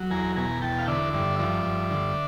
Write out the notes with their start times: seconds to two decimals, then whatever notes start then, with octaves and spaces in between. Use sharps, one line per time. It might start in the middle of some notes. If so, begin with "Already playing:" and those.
Already playing: F#3
0.11 E2 G#5 A#5
0.36 B2 G#5 A#5
0.62 E2 G5 A5
0.78 F5
0.88 D3 D5 E5
1.13 G2 D5 E5
1.39 F3 D5 E5
1.65 G2
1.91 D3